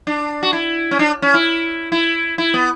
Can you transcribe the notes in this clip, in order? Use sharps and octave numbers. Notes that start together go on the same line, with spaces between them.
D4
F#4
E4
C#4
D4
C#4
E4
E4
E4
B3